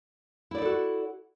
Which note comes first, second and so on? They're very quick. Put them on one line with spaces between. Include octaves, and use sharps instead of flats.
E4 D5 C5 A4 F#4